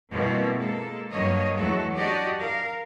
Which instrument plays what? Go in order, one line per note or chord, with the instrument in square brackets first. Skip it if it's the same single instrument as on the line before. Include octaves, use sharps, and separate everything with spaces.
[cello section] B2 F3 G3 A#3 C4 E4
G#3 A#3 A4
G2 F#3 A#3 C#5 D#5
E2 F#3 G#3 A3 F#4 A4
D4 F#4 G4 D5 D#5
A#4 F5